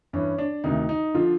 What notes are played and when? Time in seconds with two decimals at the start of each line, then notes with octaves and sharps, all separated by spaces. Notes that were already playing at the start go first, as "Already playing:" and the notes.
0.13 G2 E3 C#4
0.38 D4
0.64 D2 C3 D#3 D#4
0.89 D#4
1.15 D3 F3 F4